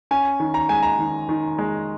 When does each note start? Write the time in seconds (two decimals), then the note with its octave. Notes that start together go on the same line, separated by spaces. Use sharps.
0.11 C#4 G#5
0.40 D#3
0.54 A#5
0.69 G#3 G#5
0.83 A#5
0.99 D#3
1.29 D#3
1.58 G#3